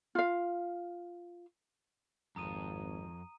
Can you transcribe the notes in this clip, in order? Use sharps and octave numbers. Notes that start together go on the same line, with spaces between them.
F4 F5
G#1 F2 A#5 D#6 D#7